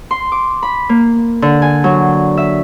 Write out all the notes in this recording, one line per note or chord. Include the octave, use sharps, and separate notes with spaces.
C6
D6
B5
A#3
D3
G#5
F#3
E5